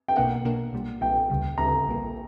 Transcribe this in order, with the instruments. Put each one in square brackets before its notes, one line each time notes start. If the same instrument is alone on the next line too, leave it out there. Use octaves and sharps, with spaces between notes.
[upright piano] G5
[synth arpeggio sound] B1 B2 A#3 D4 A#4 [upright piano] F#5
[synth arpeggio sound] B1 B2 A#3 D4 A#4
B1 A#2 G3
[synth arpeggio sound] B1 A#2 G3 [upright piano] G5
[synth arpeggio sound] D2 C#3 G3
[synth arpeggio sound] D2 C#3 G3 [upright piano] A#5
[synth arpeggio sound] A#1 A#2 G3 A#3